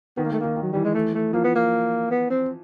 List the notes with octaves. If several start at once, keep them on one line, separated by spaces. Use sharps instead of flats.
D#3 B3
A#3
D#3 A3
D#3 A#3
D#3
F#3
E3 G3
G#3
A3
A3
F3 A#3
B3
A#3
B3
C4